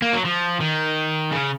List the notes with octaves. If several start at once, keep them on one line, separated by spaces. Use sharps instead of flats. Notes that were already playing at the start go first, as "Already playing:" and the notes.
A#3
F#3
F3
D#3
C#3